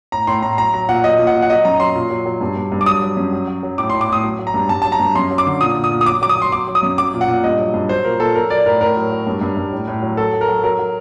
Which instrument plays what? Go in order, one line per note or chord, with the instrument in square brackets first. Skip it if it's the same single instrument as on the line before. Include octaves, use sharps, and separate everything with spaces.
[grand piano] A2 A#5
A2 C6
A2 A#5
F#3 A#5
F#3 A#5
A#2 F#5
F#3 D#5
A#2
F#5
F#3
F#5
F#3 D#5
F#2 A#5
F#3 C6
A#2
F#3
F#3
G2
G2
G2
D6
F#3 D#6
F#3
F#2
F#3
F#3
F#3
A2 D6
A2 C6
D6
A2 D#6
F#3
F#3
A#5
G2
G2 A5
F#3 A5
A#5
G2
F#2 C6
F#3
D6
D3
A#2 D#6
A#2
D#6
A#2
D#6
F#3 D6
F#3 D6
D#6
F#3 C6
F#3 D6
F#3
D#6
F#2
F#3 D6
A#2
F#5
A#2
G2 D#5
F#3
G2
F#3 C5
A#2 A#4
A#2 A4
F#3 A#4
F#3 D5
A2 A#4
A2 A#4
F#3
F#3
G2
G2
G2
A2
A2
F#3
F#3 A4
F#3
A#4
F#3
F#3 A#4
F#3